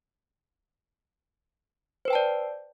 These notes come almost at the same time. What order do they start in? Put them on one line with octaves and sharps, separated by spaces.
C5 B4 G5 A5 D5